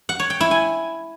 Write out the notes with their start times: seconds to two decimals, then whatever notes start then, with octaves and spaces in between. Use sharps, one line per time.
0.09 F#5
0.20 C#5
0.30 G5
0.41 E4
0.51 G#5